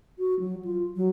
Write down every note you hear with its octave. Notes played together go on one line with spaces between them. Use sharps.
F#4
F#3
F4
F#3